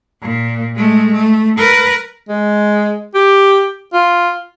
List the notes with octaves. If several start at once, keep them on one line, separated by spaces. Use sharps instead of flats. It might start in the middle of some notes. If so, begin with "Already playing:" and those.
A#2
G#3 A3
A3
A#4 B4
G#3
G4
F4